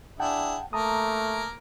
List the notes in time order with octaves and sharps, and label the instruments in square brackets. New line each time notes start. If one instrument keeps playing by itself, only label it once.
[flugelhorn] D4 [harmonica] E4 G#4 [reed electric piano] F#5 G5 A5
[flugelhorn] A3 [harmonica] A#3 [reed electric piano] A5 A#5 D#6